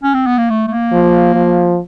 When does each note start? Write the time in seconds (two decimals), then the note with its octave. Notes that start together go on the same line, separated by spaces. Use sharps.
0.03 C#4
0.14 C4
0.26 B3
0.38 A#3
0.50 A3
0.67 A3
0.70 A#3
0.92 F3
1.34 F3